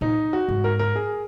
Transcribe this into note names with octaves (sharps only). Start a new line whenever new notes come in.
A#2 D#4
F#4
G#2
A#4
A#4
G#4